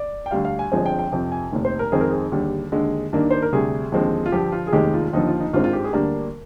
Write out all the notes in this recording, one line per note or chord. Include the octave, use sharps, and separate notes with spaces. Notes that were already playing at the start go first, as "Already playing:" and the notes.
Already playing: D5
G5
D2 D3 G3 F5
F5
G#5
G1 G2 F3 G#3 C4 G#5
G5
G5
F2 C3 F3 G5
G#5
F1 D#2 D#3
C5
A#4
F2 D#3 G#3 C4 G#4
A#4
G#4
D#2 D3 G3
D#2 D3 G#3
G2 D#3 A#3 D4
C5
A#4
D2 C3 G3 G#4
D#2 D3 F3 G#3 C4
F4
G2 D3 F3 G4
F4
G#4
F1 D#2 D#3 G#3 G4
F4
D#2 D3 F3 D#4
F4
D#4
G#1 G2 D#3 G#3 C4 F4
F4
G4
G#4
D2 D3 G3 A#3 D4 A#4